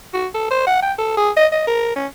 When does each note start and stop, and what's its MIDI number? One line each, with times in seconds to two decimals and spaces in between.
0.14 0.28 66
0.35 0.49 69
0.51 0.66 72
0.67 0.82 78
0.82 0.93 79
0.99 1.15 69
1.17 1.31 68
1.37 1.47 75
1.52 1.67 75
1.67 1.93 70
1.96 2.07 61